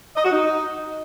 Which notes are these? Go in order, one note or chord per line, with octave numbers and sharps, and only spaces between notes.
D#5
F#4
D#4